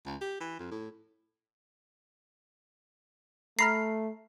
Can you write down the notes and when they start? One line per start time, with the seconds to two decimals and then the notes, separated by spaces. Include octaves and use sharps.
0.06 C#2
0.21 G4
0.40 E3
0.59 F2
0.71 A2
3.59 A3 A#5 B5 F6 C7